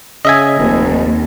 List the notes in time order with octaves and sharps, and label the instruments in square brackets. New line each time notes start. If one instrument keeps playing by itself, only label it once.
[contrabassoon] C#3 [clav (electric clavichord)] D#5 E5 G#5
[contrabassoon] F1 [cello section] D#2